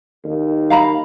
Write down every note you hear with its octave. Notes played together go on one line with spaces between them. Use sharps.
D#2
F5 A#5 B5